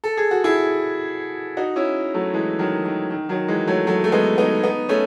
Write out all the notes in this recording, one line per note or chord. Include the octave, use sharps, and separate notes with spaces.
A4
G#4
F#4
E4 G#4
D#4 F#4
C#4 E4
F#3 A3
E3 G#3
D#3 F#3
D#3
D#3
D#3 F#3
E3 G#3
F#3 A3
F#3 A3
A3
G#3 B3
B3 D#4
B3 D#4
A3 C#4